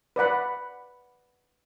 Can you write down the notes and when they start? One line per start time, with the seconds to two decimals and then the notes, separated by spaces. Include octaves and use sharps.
0.16 B4 D5 F#5 B5